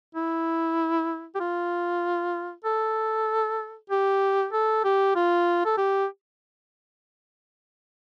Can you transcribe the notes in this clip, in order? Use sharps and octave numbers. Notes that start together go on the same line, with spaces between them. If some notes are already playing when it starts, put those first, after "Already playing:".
E4
G4
F4
A4
G4
A4
G4
F4
A4
G4